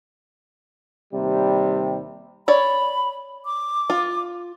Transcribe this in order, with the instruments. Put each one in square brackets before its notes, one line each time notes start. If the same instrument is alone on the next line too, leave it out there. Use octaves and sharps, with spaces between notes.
[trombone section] D#2 C3 G3
[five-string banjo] C#5 D5 [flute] B5
[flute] D6
[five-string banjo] F4